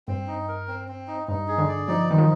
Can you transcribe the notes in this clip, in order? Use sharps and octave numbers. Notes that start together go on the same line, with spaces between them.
G2 C4
D#4
A#4
C4
C4
D#4
G2 D#4
G#4
D3
D5
F3 D#4
D#3 D#4
F3